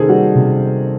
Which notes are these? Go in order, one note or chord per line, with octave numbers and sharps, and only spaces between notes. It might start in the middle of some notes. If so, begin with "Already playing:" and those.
Already playing: C3 D#3 A#3 G#4 A4 C5
G3 F#4
C3